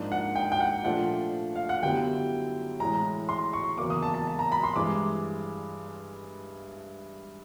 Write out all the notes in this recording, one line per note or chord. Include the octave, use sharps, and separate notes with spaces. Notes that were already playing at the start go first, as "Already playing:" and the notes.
Already playing: G#2 F3 A#3 D4
F#5
G5
G5
F#5
A#2 F3 A3 D4 F4 F#5
F5
F#5
F#2 D3 G3 B3 E4 G5
A2 E3 G#3 A#5
C6
C#6
E2 C#3 F#3 A#3 D6
D#6
A5
A5
A5
A#5
B5
C6
G2 E3 G#3 C4 D6